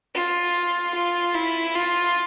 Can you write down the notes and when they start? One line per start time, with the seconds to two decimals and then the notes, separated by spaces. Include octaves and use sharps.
0.15 F4
0.95 F4
1.35 E4
1.76 F4